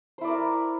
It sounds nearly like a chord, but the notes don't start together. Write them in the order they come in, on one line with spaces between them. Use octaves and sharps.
C5 E4 D5 A#4